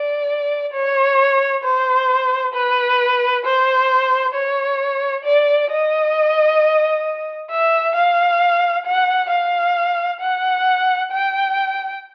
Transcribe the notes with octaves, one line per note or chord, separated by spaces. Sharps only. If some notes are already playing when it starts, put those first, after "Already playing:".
Already playing: D5
C#5
C5
B4
C5
C#5
D5
D#5
E5
F5
F#5
F5
F#5
G5